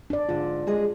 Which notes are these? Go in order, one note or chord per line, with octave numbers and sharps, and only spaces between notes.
D4 D5
G#2 D3 F4
G#3 G#4 D#5